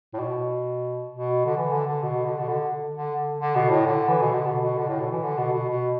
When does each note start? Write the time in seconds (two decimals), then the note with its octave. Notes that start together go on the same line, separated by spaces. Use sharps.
0.14 A2
0.19 B2
1.10 B2
1.46 D3
1.57 E3
1.72 D3
1.87 D3
2.02 B2
2.25 D3
2.39 B2
2.48 D3
2.94 D3
3.40 D3
3.55 B2
3.70 A2
3.86 D3
4.08 E3
4.22 B2
4.32 D3
4.46 B2
4.61 B2
4.77 D3
4.88 A2
5.00 B2
5.11 E3
5.23 D3
5.38 B2
5.53 B2
5.69 B2